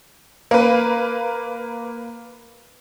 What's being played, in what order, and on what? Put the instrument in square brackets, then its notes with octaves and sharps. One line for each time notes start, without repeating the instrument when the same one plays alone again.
[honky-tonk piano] A#3 B4